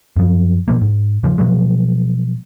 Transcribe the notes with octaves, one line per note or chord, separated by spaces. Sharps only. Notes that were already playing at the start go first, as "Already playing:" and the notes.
F#2 F3
B2 F3 A#3
G#2
E2 C#3 F3
B2 F3 F#3 G#3